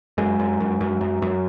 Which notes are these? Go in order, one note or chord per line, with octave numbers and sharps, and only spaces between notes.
F#2 G#3
F#2
F#2
F#2
F#2
F#2